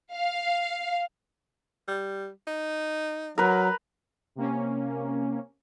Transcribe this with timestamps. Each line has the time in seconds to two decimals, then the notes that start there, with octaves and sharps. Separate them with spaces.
0.13 F5
1.88 G3
2.47 D#4
3.38 F#3 A#4 B4
4.36 C3 A#3 C#4